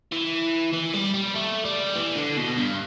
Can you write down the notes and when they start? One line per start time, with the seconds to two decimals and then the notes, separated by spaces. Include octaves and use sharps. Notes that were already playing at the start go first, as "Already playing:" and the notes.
0.12 E3
0.73 E3
0.93 G3
1.14 G3
1.35 A3
1.65 G3
1.95 E3
2.15 D3
2.37 B2
2.57 G2